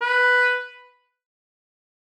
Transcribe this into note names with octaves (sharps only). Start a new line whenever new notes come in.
B4